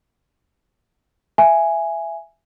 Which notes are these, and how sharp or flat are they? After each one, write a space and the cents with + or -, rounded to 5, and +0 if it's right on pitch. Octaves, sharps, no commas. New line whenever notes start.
E5 +15 G#5 +0